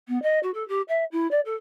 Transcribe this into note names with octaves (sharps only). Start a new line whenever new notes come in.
B3
D#5
F#4
A4
G4
E5
E4
D5
A4